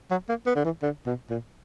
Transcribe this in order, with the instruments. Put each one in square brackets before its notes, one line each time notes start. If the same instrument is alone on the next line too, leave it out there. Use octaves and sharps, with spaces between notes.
[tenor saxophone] F#3
A#3
B3
D3
E3
D3
B2
A#2